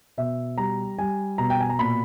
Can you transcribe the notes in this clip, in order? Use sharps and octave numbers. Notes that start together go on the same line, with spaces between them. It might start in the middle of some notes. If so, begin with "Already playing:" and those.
B2 E5
G3 A#5
G3 G#5
B2 A#5
G5
G#5
A#5
A#2 B5